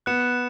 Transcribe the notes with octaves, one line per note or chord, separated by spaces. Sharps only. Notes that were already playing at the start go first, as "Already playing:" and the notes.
B3 F#6 C#7 E7